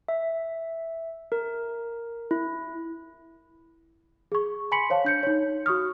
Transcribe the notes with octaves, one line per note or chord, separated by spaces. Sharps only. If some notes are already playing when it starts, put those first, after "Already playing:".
E5
A#4
E4
G#4 C#6
G#5 B5 C6 B6 C#7 F#7
C5 C#5 F5 A5
D4 G6 C#7
D#4 C#5
F#4 C#6 D#6 F6